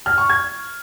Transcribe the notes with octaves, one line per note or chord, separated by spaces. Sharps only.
F6
C#6
G#6